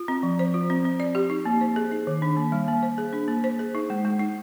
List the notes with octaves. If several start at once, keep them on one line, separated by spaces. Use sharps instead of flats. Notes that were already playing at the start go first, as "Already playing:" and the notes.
Already playing: F4
C4
F3
C5
F4
C4
C4
D5
G4
D#4
A#3
C5
G#4
D#4
D#3
D4
A#3
G3
A#3
C5
G#4
D4
A#3
C5
G#4
D#4
G#3
G#3
D#4